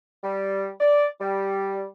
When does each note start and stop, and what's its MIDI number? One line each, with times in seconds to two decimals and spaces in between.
0.23 0.69 55
0.80 1.07 74
1.20 1.86 55